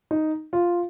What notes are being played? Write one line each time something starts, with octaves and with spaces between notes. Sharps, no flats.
D#4
F4